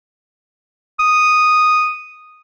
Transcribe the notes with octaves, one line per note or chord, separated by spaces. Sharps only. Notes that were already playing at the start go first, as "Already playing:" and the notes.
D#6